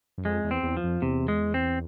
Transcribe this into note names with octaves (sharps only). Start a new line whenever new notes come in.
F#2
F2 G#3
E2
C4
E2
F3
F2
E2 C3
G#3
C4